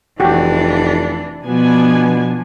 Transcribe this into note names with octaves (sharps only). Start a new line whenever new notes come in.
F1 E3 D4 F#4 G4
B2 F3 B3 D4 G#5